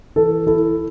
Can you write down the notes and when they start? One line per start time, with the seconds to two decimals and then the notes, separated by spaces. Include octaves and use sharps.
0.16 E3 A4
0.47 E4 A4